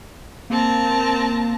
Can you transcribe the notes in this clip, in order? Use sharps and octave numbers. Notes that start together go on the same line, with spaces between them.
A#3 C4 A5 A#5